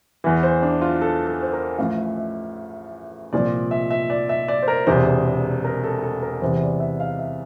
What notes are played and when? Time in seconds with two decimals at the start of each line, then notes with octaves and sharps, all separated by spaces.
0.24 E2 E3
0.43 C5
0.62 D4
0.82 F4
1.01 A4
1.27 A4
1.42 C5
1.53 A#4
1.78 A1 A2 F3 F5
1.98 E5
2.17 E5
3.33 C2 A#2 F3 D5
3.71 E5
3.91 E5
4.10 D5
4.29 E5
4.48 D5
4.63 C5
4.68 A#4
4.87 E1 E2 C3 C5
5.65 A#4
5.84 A4
6.03 A4
6.22 A#4
6.42 E2 C3 E3 C5
6.61 D5
6.80 E5
7.00 F5
7.19 E5